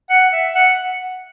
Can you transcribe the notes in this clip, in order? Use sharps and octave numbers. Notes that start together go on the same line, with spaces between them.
F#5
E5
F#5